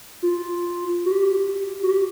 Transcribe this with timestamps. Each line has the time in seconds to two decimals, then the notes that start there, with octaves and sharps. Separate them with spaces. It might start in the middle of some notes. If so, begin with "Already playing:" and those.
0.22 F4
1.06 F#4
1.11 G4
1.83 F#4
1.91 G4